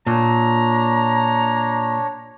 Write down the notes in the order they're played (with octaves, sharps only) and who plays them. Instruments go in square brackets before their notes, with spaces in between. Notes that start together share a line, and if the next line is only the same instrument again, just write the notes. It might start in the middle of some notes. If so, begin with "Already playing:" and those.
[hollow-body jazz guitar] A#2 [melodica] D4 C#5 [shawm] A#5